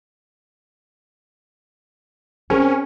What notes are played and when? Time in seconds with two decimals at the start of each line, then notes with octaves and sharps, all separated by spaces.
2.50 C4 C#4 G#4 A#4